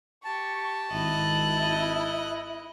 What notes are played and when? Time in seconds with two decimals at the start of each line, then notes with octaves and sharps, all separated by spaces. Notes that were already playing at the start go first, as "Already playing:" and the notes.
0.25 G4 A5 C#6
0.91 G#1 E4 D#5 F#6